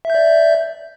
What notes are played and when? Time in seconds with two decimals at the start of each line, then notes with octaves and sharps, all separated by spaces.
0.05 E5
0.10 G6
0.15 D5